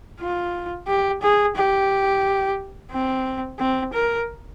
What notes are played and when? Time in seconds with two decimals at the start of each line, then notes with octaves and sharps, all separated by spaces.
0.21 F4
0.87 G4
1.22 G#4
1.56 G4
2.92 C4
3.59 C4
3.94 A#4